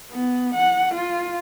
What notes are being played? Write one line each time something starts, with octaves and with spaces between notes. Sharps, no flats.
B3
F#5
F4